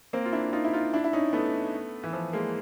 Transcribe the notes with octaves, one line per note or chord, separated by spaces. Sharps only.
A#3 C4
F4
D4 E4
D#4 F4
E4
D#4 F4
D4 E4
E4
C#4 D#4
A3 B3
E3
F3
G#3 A#3